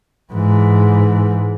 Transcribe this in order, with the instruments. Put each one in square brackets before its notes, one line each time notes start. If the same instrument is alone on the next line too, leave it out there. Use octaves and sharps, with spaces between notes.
[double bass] G#2 E3